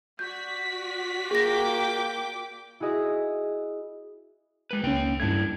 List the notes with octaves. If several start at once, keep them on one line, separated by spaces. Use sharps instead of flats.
F#4 D5 G6 B6
A#3 G#4 G5 D6 A#6
E4 F#4 G#4 D#5 E5
G#3 B4
C#2 A#3 C#4 G5
G2 A3 D4 E4 G#6